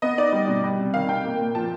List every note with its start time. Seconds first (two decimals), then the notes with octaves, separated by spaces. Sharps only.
0.02 B3 D#5
0.18 D#4 D5
0.32 G3
0.48 B2
0.64 G3
0.79 C3
0.94 D#3 F5
1.09 C3 G5
1.25 A#3
1.40 A#2
1.55 F3 A5